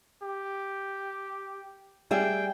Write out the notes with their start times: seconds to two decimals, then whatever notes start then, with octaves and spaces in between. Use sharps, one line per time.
0.23 G4
2.11 G3 G#4 E5 G5